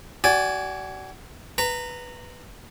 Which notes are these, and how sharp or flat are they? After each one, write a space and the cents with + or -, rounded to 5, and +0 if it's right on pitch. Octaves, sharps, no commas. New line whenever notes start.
F#4 +35 D5 -15 G#5 +0
B4 +0 A#5 -20